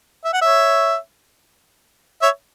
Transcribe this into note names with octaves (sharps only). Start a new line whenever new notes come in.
E5
F#5
C#5 E5
C#5 E5